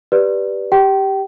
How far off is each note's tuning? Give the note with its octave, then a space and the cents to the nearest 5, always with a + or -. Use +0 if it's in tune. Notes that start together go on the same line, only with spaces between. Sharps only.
G4 +0 B4 -5 D5 +0
G4 +0 G5 -30